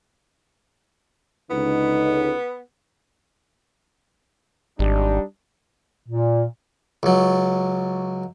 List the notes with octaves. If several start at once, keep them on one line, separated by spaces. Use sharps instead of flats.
C#2 D3 B3 D#4
G#1 G3 D4 D#4
A#2
C#2 F#3